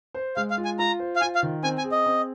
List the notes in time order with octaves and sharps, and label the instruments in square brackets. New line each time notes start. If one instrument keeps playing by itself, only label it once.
[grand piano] C5
[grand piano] G#3 [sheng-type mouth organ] F5
[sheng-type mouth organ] F5
[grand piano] F4
[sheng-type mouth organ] G#5
[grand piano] F4 [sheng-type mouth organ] A#5
[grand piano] C5
[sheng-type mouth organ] F5
[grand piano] F4 [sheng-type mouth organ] G#5
[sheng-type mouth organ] F5
[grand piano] D#3
[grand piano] C4 [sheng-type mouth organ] G#5
[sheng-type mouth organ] G#5
[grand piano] G#4
[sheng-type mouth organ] D#5
[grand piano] C4